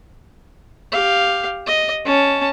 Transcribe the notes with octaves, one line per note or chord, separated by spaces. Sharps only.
G4 F5
D#5
C#4 A5